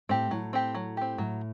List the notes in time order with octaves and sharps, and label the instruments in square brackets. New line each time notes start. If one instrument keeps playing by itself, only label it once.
[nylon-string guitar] A2 [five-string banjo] C4 G4
[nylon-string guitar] A2 [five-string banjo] F#3
[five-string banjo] C4 G4
F#3
C4 G4
[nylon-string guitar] A2 [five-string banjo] F#3